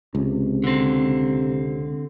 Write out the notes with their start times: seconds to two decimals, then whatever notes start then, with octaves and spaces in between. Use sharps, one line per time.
0.15 C#2 C3
0.64 D3 C4